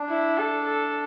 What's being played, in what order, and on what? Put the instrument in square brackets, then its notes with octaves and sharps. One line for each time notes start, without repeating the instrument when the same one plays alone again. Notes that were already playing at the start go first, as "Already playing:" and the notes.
Already playing: [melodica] D4
[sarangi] E4
A4
A4